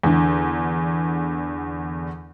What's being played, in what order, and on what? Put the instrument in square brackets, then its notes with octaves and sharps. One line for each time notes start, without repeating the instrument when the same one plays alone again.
[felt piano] E2 D3